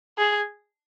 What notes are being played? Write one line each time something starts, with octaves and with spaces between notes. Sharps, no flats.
G#4